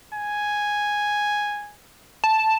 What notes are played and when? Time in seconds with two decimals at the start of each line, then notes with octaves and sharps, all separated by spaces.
0.14 G#5
2.24 A5